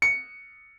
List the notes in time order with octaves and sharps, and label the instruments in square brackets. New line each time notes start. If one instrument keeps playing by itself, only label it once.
[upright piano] C#7